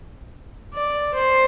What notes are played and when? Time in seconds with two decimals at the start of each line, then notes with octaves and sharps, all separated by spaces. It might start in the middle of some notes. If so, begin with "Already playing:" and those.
0.73 D5
1.14 C5